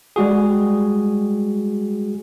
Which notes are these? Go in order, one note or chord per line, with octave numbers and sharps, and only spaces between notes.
G3 G#3 F#4 G#4